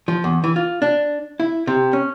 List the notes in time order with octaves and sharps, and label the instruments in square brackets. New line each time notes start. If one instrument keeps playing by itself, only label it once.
[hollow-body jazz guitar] F3
E2
E3
F4
D4
E4
C3
C#4